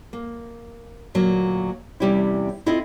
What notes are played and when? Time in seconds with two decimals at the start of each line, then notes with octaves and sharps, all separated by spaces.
0.13 A#3
1.14 D2 A#2 F#3 A#3
2.00 E2 C3 G3 C#4 E4
2.66 C4 E4 F4 A4 D#5